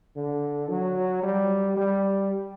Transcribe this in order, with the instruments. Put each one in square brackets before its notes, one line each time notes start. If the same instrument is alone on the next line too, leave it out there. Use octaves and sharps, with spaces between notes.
[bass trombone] D3
F#3
G3
G3